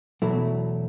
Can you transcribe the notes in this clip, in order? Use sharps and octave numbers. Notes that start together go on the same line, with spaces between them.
E2 B2 F#3 A3 E4